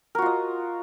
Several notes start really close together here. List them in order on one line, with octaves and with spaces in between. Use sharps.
A#4 F#4 F4 D#5